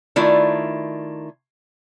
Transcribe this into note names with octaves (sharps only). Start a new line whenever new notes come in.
D#3 A3 E4 F4 D5